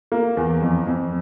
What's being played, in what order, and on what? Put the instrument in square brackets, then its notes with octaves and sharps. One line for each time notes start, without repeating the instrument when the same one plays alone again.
[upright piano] A#3
E2
F2
F2